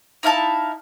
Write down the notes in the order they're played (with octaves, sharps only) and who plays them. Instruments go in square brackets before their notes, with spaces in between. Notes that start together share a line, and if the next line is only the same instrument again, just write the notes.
[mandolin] D#4 E4 F5 A5